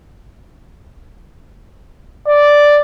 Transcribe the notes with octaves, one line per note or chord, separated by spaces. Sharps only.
D5